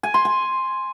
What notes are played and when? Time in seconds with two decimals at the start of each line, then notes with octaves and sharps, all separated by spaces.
0.03 G#5
0.14 C6
0.25 G#5